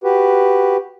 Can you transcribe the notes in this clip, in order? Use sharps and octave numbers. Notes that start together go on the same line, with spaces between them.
F#4 G4 B4